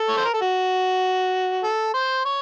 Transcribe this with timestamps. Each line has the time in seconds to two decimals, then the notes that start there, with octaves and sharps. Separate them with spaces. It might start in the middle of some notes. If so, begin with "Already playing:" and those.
Already playing: A4
0.09 C#5
0.17 C5
0.25 A#4
0.34 A4
0.41 F#4
1.64 A4
1.94 C5
2.25 C#5